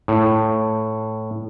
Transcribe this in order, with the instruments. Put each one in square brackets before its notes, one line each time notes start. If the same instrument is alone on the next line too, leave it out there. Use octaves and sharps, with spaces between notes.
[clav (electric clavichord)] A2